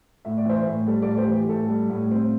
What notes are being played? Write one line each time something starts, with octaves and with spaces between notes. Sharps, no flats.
A2 E5
D5
E3 C5 E5
A2
G3 A4
A4 D5
A2
G4 C5
E3
G4
A2 A4
G3
A2
C4